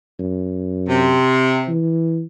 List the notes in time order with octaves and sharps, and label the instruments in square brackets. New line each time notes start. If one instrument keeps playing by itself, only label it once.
[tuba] F#2
[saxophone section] C3
[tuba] E3